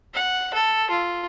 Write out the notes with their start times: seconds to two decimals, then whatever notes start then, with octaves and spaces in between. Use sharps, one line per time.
0.14 F#5
0.54 A4
0.90 F4